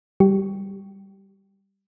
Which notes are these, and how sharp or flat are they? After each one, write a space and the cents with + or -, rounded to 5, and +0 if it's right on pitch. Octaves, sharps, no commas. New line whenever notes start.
G3 +0 G4 -15